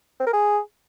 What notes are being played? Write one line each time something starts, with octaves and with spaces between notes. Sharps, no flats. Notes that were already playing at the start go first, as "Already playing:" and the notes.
C4
A#4
G#4